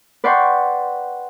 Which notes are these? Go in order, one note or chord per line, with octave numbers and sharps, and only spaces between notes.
B4 D5 F#5 G5 C6 C#6